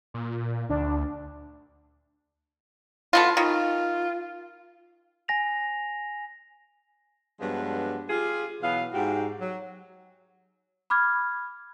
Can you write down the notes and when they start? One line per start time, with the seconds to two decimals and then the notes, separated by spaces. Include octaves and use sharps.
0.14 A#2
0.69 D2 D4
3.13 A3 B3 F4
3.37 D#3 F4
5.28 G#5 A#6 F7
7.40 G2 F3 F#3 G#3 B3 D4
8.09 F4 G4 G#4
8.62 B2 E3 F#3 B3 F5
8.92 G#2 F#4 G4
9.40 F#3
10.90 B5 D6 F6 G#6